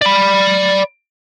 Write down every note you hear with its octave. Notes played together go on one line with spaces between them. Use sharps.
D5 B5